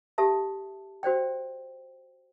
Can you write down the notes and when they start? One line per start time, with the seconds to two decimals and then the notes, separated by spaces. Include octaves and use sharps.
0.18 G4 A4 E5 A5
1.03 F#4 C5 D5 G5